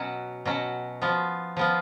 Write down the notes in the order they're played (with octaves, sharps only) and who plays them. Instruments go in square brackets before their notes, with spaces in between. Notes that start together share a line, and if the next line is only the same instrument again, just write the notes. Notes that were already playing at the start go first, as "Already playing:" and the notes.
Already playing: [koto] B2 F#3 C#4
B2 F#3 C#4
F3 B3 F4
F3 B3 F4